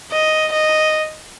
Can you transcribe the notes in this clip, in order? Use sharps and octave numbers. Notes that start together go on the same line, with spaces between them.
D#5
D#5